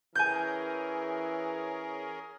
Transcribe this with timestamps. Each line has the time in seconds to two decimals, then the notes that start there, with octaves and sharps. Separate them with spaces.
0.15 E3 C#4 G#4 A#4 G#5 G6